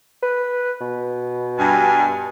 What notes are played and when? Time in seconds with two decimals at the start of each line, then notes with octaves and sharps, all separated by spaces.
0.23 B4
0.81 B2
1.58 G2 G#5